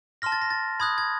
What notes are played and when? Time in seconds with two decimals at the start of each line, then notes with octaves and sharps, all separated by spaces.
0.22 A5 C6 F6 A#6
0.32 A6
0.42 A#6
0.50 A6
0.80 B5 D#6 F#6 G#6
0.98 G#6